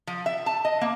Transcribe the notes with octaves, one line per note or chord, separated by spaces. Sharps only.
F3
E5
A5
D#5
A#3